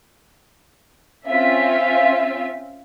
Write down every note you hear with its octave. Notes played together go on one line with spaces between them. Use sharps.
C4 C#4 F4 E5